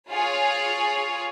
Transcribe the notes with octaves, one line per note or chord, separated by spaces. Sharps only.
F4 G#4 C#5